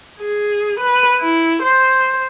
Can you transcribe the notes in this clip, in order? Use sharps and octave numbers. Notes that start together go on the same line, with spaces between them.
G#4
B4
E4
C5